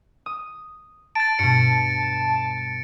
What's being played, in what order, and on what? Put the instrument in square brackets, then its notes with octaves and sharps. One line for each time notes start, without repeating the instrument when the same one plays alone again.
[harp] D#6
[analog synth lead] A5 [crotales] A6 D7
[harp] G2 B2 [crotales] C#7